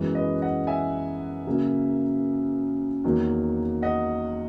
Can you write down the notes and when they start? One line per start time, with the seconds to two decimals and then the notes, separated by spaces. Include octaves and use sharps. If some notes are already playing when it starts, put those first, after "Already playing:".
Already playing: F#2 E3 G#3 B3
0.15 B4 D#5
0.42 D#5 F#5
0.67 E5 G#5
1.47 C#3 F#3 A#3
3.04 E2 D#3 F#3 A#3
3.82 D#5 F#5